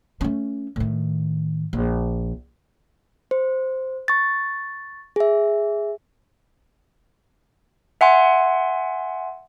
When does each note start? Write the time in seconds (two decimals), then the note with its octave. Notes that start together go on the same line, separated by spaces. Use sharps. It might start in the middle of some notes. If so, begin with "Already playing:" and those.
0.21 A3 C#4
0.76 A2 D#3
1.73 A#1
3.31 C5
4.08 C#6 A6
5.16 G#4 E5
8.01 E5 F#5 G#5 C6